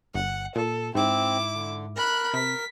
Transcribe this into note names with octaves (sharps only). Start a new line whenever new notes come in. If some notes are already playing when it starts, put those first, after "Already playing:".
G1 F#5
A#2 A4
G#2 C4 E4 D6
D3
A#4 B5 F#6
C3 B6